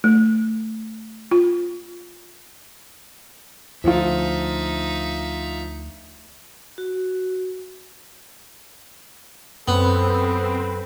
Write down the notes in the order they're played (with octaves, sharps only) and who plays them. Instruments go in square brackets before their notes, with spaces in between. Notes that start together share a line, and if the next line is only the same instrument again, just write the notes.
[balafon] A3
F4
[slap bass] D2 [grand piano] F3 F4 [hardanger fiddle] D#4 E5
[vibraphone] F#4
[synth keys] F#2 [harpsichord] B3 [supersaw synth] C4 [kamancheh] A4 B4